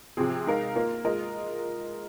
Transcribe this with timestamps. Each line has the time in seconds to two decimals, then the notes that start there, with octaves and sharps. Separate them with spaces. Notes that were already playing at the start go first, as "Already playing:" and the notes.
0.17 C3 F3 C4 G#4
0.46 G#3 D#4 A#4 F5
0.75 A#3 F4 A#4
1.05 G#3 F4 A#4 D#5